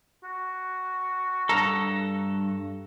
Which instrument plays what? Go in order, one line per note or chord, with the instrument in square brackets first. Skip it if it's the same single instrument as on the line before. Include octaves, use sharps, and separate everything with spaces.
[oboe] F#4
[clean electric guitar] G2 A4 [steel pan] A#5